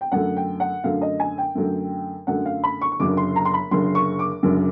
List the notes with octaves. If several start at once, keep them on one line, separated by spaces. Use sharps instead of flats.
G5
F#2 D3 F#3 A3 F#5
G5
F#5
F#2 D3 F#3 A3 F5
D#5
G#5
G5
F#2 D3 F#3 A3
F#2 D3 F#3 A3 F#5
F5
B5
C#6
C#6
F#1 F#2 D3 F#3 D6
C6
A#5
C6
B5
F#1 F#2 D3 F#3 C6
C#6
D6
F#1 F#2 D3 F#3